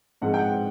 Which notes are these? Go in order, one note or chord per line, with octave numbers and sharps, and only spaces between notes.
G#2 F3 G#3 C4 F#5
G5
F#5